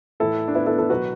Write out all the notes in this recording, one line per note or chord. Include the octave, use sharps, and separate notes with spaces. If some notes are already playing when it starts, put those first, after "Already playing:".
A2 E3 E4 A4
D4
B3 E4
E4 A4
E4 A4
B2 F#3 F#4 B4